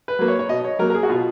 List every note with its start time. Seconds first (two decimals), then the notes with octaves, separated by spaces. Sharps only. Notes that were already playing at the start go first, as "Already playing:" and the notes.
0.08 B4
0.19 F#3 A#3
0.28 C#5
0.39 C#5
0.49 B2 D#5
0.64 C#5
0.79 F#3 A#3 A#4
0.90 A#4
0.95 G#4
1.03 F#4
1.09 B2 F4